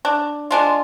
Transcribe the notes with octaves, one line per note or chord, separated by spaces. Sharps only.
D4
G#3 D4 F4